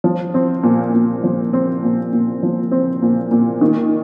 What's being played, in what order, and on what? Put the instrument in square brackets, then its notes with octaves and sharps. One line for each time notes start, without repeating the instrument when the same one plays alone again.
[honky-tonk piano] F3
C4
A#2
A#2
F3
C4
A#2
A#2
F3
C4
A#2
A#2
D#3